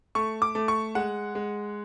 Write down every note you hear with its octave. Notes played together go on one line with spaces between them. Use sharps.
A3 C#6
D6
A3
C#6
G#3 F#5
G#3